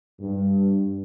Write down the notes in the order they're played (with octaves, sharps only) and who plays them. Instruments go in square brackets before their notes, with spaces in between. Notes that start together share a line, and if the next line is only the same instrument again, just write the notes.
[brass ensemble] G2